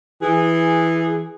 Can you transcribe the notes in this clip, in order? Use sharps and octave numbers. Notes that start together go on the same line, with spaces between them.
E3 G#4